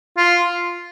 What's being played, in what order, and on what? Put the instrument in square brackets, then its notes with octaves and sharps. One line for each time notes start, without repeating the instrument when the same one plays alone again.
[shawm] F4